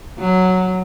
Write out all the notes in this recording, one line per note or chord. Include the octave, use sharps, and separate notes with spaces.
F#3